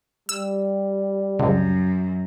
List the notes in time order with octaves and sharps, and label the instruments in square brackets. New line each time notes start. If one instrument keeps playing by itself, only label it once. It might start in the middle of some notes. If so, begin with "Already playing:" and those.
[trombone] G3 [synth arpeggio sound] E6
[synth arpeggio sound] C#2 [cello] F#2